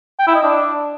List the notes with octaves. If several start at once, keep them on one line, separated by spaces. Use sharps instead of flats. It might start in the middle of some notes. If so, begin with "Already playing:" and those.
G5
E4
D#5
D4